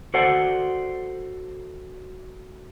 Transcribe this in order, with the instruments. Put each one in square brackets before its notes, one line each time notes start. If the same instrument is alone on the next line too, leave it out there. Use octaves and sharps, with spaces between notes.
[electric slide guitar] F#4 A4 C5 D5 F#5